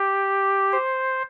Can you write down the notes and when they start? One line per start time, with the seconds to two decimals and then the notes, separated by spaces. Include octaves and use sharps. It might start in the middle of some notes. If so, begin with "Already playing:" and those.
Already playing: G4
0.72 C5